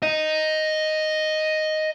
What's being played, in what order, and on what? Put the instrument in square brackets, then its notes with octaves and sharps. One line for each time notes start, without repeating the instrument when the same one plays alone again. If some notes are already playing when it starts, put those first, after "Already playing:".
[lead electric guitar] D#5 A#5